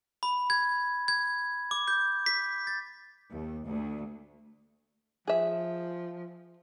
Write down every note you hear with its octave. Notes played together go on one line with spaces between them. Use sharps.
B5
G#6
G#6
D6
G6
B6
A6
D#2
D2
F3 G#4 E5